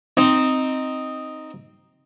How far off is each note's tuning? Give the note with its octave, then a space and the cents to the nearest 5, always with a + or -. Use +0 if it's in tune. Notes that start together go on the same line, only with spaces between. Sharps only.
C4 -5 D#4 +0